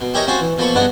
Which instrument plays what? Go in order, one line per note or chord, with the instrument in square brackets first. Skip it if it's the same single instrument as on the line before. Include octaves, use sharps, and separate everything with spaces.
[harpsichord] B2
E4 G4 G#4 A#4 C#5 D#5
C4 C#4 F4 F#4 C5
E3
B2 F3 A#3 A4 B5 C#6
G2 C#3 B3 D4 D#5 F#5